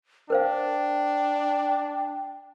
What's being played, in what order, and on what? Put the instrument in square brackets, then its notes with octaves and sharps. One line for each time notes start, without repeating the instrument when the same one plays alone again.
[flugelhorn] D4 [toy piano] A#4 C5 F5 [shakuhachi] G5